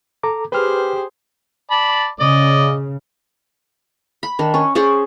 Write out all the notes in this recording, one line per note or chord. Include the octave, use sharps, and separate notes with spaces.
A4 A#5 D6
G4 G#4 B4 C5 F6
D5 A5 B5
C#3 D5 D#5
B5
D#3 D4
C#4
C#4 G#4 C5 D5